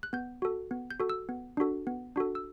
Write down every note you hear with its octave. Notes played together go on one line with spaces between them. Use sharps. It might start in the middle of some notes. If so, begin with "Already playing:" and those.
F#6
B3 G6
F#4 A4
B3
G6
F#4 A4
E6
B3
D4 F#4 A4
B3
D4 F#4 A4
E6